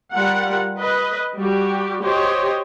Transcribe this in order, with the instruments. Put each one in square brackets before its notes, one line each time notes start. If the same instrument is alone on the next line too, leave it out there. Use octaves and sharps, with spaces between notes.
[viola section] G3 F4 A#4 F#5
B4 D#5
G3 F#4 G4
F#4 G4 C5 C#5 D#5